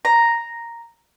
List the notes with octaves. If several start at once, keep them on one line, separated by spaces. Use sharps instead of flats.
A#5